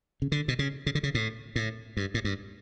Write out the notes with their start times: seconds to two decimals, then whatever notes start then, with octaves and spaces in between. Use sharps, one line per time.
0.22 C#3
0.32 D3
0.48 B2
0.59 C#3
0.86 C#3
0.95 D3
1.03 C#3
1.15 A2
1.56 A2
1.97 G2
2.14 A2
2.25 G2